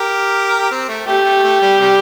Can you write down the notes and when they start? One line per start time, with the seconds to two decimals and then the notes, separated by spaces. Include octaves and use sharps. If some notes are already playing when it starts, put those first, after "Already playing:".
Already playing: G4 A#4
0.71 C4
0.89 A3
1.07 A3 G4
1.25 A3
1.43 A3
1.62 G3
1.80 C3 G3